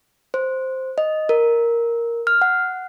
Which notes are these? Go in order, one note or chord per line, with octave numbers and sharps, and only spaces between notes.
C5
D#5
A#4
F6
F#5